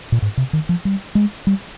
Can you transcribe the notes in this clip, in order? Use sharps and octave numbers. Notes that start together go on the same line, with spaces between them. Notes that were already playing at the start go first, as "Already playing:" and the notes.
A#2
G#2
C3
D#3
F3
G3
G#3
G3